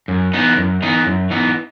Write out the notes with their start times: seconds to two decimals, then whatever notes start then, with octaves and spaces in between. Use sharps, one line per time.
0.08 F#2
0.33 E3 B3 D#4
0.57 F#2
0.82 E3 B3 D#4
1.06 F#2
1.30 E3 B3 D#4